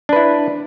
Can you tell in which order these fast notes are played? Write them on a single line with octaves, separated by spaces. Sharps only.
D4 B4 E4